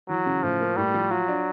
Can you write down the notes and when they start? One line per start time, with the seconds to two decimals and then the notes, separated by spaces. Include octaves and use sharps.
0.08 E3 F#3
0.26 C#3
0.42 A2 F3
0.60 A#3
0.77 A2 G3
0.94 F3
1.11 F#3 F4
1.28 D4